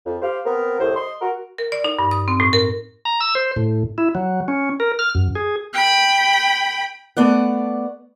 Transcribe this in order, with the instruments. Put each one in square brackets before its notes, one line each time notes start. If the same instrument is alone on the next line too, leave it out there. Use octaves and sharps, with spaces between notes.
[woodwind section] F2
G4 C5 F5
B3 C4 A#4
C2 A2 C5
D#5 C6
F#4 A#4
[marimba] A#4
D5
D#4
G2
D#6
C4
A2
A#4
[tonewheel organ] A#5
E6
C5
A2
E4
F#3
C#4
A#4
F6
F#2
G#4
[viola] G5 B5
[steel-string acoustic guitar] A3 B3 D5 F#5